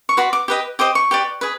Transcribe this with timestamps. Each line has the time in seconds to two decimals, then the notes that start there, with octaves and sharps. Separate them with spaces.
0.09 C#6
0.17 F#4 B4 D5 C6
0.33 D6
0.48 G4 B4 D#5
0.79 G4 C5 D#5 D6
0.95 C#6
1.11 G4 B4 D5
1.41 G#4 B4